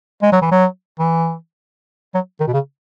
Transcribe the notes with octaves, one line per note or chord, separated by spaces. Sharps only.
G#3
F#3
E3
F#3
E3
F#3
D#3
B2
C#3